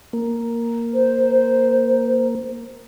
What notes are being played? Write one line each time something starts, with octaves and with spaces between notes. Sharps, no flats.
A#3
C5